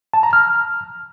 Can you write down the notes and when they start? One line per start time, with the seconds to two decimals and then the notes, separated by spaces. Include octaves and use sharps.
0.13 A5
0.23 A#5
0.33 F6